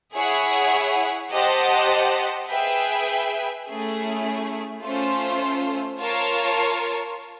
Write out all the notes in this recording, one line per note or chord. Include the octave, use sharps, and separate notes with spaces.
E4 G#4 C#5 F#5
G4 C5 D#5 F#5 A5
G#4 B4 E5 G5
A3 C#4 E4 G#4
A3 C#4 F4 A4 C5
F4 A#4 C#5 F5 A5